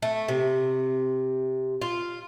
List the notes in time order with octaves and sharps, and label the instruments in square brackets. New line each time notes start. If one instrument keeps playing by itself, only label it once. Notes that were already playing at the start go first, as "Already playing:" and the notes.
[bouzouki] A3
C3
F4